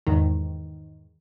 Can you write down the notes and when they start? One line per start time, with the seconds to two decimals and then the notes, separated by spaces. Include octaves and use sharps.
0.07 E2 G#2 D#3